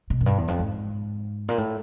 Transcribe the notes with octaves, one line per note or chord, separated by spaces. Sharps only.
B2
F#2
G2
E2
F2
G#2
A#2
A2